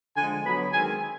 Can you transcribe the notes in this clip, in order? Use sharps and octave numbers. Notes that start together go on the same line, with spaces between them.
D3 F3 G#3 G#5
D3 F#3 B3 B5
D#3 G#3 C4 G#5